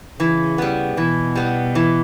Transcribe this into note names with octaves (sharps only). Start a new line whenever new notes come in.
C#3 E3
G3 B3
B2 E3
G3 B3
E3